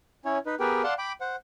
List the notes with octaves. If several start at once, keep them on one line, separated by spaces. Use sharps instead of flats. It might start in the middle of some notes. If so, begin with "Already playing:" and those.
C#4 E4 C#5
D#4 B4
B3 G4 G#4 A#4 B4 G5
D5 F5 F#5 A5 C6
G5 B5 D6
C5 F#5